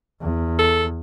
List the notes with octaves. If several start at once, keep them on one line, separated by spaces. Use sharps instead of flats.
E2
A4